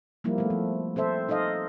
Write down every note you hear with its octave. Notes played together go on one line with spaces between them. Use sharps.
F3 G3 A#3 E4
A3 B3
F3
C4 A4 C5 E5
D#4 A4 C5 D#5 F5